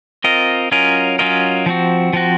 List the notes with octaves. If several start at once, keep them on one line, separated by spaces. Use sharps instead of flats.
C4 F4 A#4 D#5
F#3 C#4 F4 A#4 D#5
F#3 C#4 F4 A#4 D#5
F3 C4 F#4
F3 C4 F#4